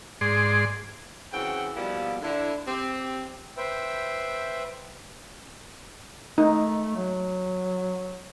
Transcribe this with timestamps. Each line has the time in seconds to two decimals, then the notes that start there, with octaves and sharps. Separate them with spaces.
0.21 G#2 G#4 D5 C6
1.32 C#3 E3 F#3 C4 F#5 G5
1.75 B2 F3 G3 A#3 B3 E4
2.21 D3 E4
2.67 C4 G4
3.57 B4 C5 E5 G5
6.38 A3 D#4
6.97 F#3